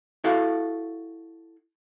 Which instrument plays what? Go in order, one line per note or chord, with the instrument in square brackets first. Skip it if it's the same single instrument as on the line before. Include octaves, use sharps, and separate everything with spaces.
[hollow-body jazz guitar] E4 F#4 A4 F5